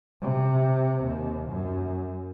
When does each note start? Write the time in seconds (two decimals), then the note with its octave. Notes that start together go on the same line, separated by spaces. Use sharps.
0.21 C3
1.04 D#2
1.49 F#2